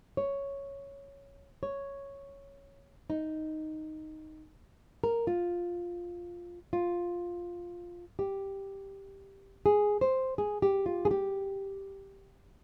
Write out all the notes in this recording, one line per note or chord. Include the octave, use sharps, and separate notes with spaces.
C#5
C#5
D#4
A#4
F4
F4
G4
G#4
C5
G#4
G4
F4
G#4
G4